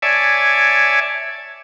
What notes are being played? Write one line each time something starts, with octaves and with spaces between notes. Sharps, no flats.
C#5 D5 E5 G#5 A5